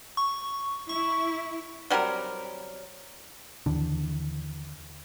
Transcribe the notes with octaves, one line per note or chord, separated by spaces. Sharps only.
C#6
E4 C#6
F#3 G3 C4 A#4
D#2 D3 E3 D4